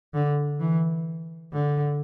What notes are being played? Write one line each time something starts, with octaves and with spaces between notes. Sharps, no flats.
D3
E3
D3